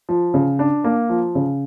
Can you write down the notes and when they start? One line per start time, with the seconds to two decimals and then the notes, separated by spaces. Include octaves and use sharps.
0.09 F3
0.34 C#3
0.59 D4
0.84 A#3
1.09 F3
1.35 C#3